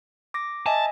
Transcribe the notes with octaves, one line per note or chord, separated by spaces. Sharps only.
D6 A#6
D#5 E5 G#5 A5